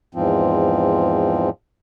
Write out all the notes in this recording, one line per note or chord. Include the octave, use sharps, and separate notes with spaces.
E2 G#2 F3 C4